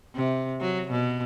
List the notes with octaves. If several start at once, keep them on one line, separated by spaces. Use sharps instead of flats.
C3
F#3
B2